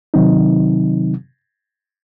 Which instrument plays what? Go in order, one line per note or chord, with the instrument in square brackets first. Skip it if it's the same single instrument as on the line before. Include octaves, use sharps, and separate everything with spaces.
[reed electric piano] C3 D#3 F#3 C4 D#4